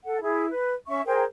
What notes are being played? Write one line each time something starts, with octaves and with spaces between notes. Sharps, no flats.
A4 F#5
E4 G#4
B4
C#4 E5 C#6
G#4 A#4 C5 G5